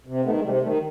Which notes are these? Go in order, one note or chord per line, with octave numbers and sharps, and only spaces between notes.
C3
D#3 A3 B3
G#3
C3 G3 A3
D#3 G3 A3